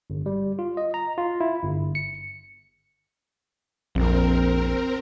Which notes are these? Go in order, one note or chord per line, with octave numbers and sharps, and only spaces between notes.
G1
G3
F4
D#5
A#5
F4
E4
G1
C#7
A#1 F2 C4 A#4